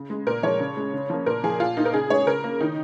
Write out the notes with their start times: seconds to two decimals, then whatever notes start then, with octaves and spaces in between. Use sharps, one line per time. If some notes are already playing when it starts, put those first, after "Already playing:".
Already playing: C#3
0.10 G#3
0.26 A#2 A#4
0.43 F3 G#3 C#5
0.60 C#3
0.77 G#3
0.94 C#3
1.10 F3 A#3
1.26 A#2 A#4
1.44 F3 A#3 G#4
1.60 A#2 F4
1.77 A#3 D#4
1.85 A#4
1.94 C#3 G#4
2.10 G#3 C#5
2.26 C#3 A#4
2.44 A#3
2.61 D#3 D#4